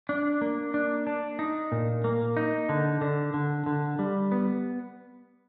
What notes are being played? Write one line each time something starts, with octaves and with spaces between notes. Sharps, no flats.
D4
A#3
D4
D4
D#4
A#2
A#3
D#4
D3
D3
D3
D3
G3
B3